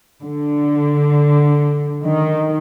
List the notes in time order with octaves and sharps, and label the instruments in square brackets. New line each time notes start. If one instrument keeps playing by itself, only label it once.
[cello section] D3
D#3